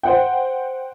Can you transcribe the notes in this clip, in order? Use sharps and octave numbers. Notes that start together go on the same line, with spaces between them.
C5 F#5 G5